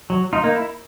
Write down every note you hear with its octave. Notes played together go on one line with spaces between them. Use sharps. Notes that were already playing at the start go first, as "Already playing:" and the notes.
F#3
D#4 F4
A#3 D#4
E4